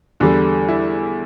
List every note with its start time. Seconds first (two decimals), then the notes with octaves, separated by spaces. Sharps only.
0.20 E2 D3 G3 D4
0.68 E4